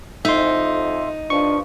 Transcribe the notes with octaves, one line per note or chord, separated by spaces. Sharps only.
F2 D#4 E5 C6
G2 F3 D4 C#6